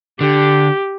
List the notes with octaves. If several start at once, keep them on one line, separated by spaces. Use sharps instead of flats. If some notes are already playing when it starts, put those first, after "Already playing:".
D3 G4